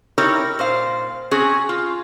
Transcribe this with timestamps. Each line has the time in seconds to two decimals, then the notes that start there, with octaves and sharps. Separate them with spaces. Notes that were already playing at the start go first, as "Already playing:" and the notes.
0.18 D#4 E4 G4 A#4 C#5
0.59 A#2 C5 F5
1.31 C4 C#4 F#4 G#4
1.69 F4